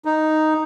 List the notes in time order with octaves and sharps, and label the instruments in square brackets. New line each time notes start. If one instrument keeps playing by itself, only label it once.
[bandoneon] D#4